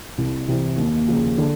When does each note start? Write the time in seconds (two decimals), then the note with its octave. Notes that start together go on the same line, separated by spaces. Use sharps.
0.18 C2
0.48 C3 E3
0.78 D#2
1.08 C#3 F3 A#3
1.38 D3